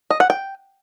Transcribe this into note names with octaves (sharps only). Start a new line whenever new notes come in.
D#5
F#5
G5